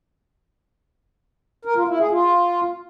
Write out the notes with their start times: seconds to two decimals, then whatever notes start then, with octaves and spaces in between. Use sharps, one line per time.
1.65 A#4
1.77 F4
1.88 E4
1.99 G#4
2.11 F4